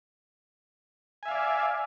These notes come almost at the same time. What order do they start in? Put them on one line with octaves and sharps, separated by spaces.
G#5 E5 F5 D5